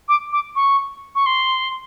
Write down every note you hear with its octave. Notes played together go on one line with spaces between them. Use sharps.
D6
D6
C#6
C#6
C6